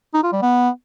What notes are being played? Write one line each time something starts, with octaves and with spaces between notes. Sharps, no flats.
D#4
F4
G3
B3